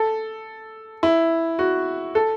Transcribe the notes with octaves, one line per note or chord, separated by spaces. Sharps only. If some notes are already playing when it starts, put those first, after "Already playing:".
Already playing: A4
E4
F#4
A4